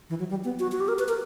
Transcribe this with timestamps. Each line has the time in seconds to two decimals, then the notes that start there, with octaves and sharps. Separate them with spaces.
0.10 E3
0.19 F#3
0.30 G3
0.44 B3
0.59 F#4
0.72 F#4
0.80 G4
0.88 A#4
0.99 B4
1.09 A#4